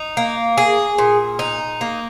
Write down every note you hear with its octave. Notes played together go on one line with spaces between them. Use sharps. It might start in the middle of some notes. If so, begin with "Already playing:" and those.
Already playing: D#4
A#3
G#4
A#2
D#4
A#3